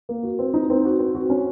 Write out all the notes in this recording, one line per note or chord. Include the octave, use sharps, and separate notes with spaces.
A#3
F#4
C4
D#4
C4
F#4
C4
F#4
C#4